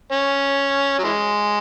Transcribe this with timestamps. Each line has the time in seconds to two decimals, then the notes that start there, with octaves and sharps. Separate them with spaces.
0.12 C#4
0.99 F#3
1.04 E3 G#3